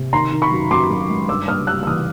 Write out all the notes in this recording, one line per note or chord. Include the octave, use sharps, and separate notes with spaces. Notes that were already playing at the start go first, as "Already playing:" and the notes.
Already playing: C3
D#3 A#5 C6
D#3
B5 C#6
F#2
F#2 C6 D6
F#2
G#3
G2 D6 E6
G2 D#6 F6
G3 E6 F#6
E6
E3 D#6 F6